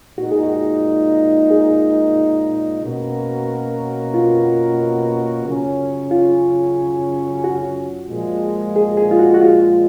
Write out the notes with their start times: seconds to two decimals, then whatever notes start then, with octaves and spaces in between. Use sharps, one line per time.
0.18 A#2 G#3 D#4 F#4
0.31 G#4
0.43 F#4
1.50 G#4
2.82 B2 A#3 C#4 F#4 A#4
4.14 F4
5.46 C#3 F#3 C#4
6.11 F4
7.44 F#4
8.09 A#2 F3 G#3
8.76 G#4
8.97 G#4
9.11 F4
9.19 F#4
9.34 F#4
9.41 F4